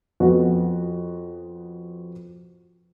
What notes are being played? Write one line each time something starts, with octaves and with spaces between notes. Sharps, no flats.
F2 B3 F#4